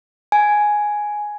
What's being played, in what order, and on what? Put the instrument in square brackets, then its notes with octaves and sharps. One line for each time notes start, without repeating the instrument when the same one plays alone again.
[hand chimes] G#5